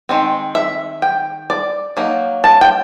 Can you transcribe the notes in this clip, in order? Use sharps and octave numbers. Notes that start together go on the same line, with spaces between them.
D#3 G#3 C4
E5
G5
D5
F#3 A#3 D#4
A5
G5